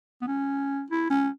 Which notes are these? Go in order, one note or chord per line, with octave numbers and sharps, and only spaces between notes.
B3
C#4
E4
C#4